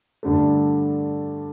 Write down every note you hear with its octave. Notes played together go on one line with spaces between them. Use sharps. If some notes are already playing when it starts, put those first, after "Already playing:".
G2 D3 A3